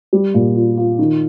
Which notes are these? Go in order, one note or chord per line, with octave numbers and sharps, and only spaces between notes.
G3
A#2
F4
F4
D#3